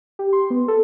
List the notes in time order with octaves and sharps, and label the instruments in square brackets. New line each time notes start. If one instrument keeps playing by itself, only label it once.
[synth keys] G4
C6
B3
A4